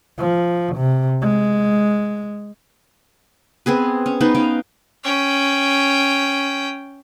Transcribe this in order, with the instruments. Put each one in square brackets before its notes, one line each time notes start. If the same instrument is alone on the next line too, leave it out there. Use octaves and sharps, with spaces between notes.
[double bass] F3
C3
G#3
[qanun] B3 C4 G#4 B4
C#4
B3 D#4 B4 C5
C#4 D#4 F5 G5
[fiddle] C#4 G5